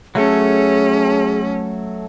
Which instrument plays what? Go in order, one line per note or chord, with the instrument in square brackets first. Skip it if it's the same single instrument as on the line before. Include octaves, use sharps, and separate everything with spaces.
[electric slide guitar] F#3 A3 A4 [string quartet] C#4 [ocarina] G#4